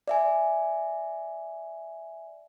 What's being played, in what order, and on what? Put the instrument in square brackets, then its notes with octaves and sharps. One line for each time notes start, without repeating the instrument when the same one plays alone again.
[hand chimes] D5 E5 G#5